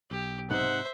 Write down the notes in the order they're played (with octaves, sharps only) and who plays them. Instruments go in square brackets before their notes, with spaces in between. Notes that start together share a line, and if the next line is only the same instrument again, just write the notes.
[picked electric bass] B1 [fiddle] G4
[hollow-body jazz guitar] G#2 C3 D#4 [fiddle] C5 E5 [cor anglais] F#5